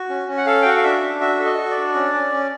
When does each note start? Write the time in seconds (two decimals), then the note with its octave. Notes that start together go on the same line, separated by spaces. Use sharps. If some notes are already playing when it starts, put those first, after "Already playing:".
Already playing: F#4
0.09 C#4
0.27 C#4
0.37 F#5
0.46 A4 F5
0.62 G5
0.65 F#4 F#5
0.77 F5
0.84 D4 E5
1.02 D4
1.21 F#4 E5
1.40 A4
1.46 D#5
1.58 F#4
1.70 D5
1.77 D4
1.95 C#4
2.14 C#4
2.32 C#4